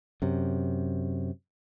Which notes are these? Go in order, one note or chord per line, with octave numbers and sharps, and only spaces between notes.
F#2 C3